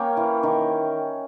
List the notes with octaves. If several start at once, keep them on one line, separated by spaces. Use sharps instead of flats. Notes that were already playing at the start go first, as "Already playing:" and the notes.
Already playing: A#3 C#4 G5
E3
D#3